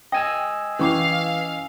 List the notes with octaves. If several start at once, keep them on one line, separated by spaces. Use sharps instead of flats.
D#5 G5 G#5 E6
E3 C#4 F5 C#6 D6